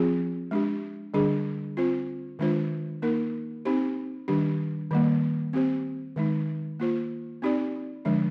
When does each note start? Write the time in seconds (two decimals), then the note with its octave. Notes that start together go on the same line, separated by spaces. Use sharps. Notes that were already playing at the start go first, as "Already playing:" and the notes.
Already playing: F3 C4 F4 G#4
0.51 G#3 D4 G4
1.14 D3 G3 D4 G#4
1.77 C4 F4 C5
2.39 D#3 G#3 D4 F4 C5
3.02 A#3 D#4 A#4
3.65 C4 D#4 G4 C5
4.28 D#3 G3 D4 G4
4.91 D#3 G3 A#3
5.53 C4 G4 C5
6.16 D#3 G#3 D#4
6.80 A#3 F4 C5
7.42 C4 D#4 G4 D5
8.05 D3 F3 G#3 D4